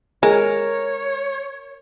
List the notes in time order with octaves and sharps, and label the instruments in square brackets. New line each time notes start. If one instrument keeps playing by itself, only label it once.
[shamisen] G#3 [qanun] A#4 [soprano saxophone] C#5